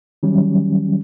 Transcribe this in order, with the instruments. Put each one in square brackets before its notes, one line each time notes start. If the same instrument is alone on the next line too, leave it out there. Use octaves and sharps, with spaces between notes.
[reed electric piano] D#3 F#3 G3 C#4